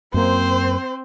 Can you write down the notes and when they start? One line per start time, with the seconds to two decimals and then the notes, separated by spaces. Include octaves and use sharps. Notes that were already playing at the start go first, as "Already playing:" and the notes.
0.14 F#2 A#3 C4 C5